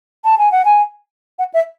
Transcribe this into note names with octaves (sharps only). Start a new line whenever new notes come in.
A5
G#5
F#5
G#5
F#5
E5